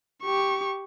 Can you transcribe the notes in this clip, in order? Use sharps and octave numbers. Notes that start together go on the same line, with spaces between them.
G4 C#6